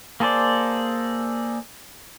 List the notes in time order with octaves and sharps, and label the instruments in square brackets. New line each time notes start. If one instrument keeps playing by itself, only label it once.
[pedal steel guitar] A#3 G#4 A4 C5 D5